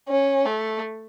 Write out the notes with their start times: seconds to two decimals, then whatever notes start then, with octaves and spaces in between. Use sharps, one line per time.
0.08 C#4
0.45 A3